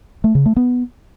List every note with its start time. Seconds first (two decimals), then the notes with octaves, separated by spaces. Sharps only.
0.24 A3
0.35 C#3
0.46 A3
0.56 B3